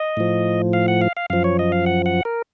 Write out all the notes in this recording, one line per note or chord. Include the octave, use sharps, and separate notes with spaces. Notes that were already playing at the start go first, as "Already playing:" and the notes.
Already playing: D#5
A2 F3
F5
F#5
F5
F5
F#2 F3 F5
C#5
D#5
F5
F#5
F#5
A#4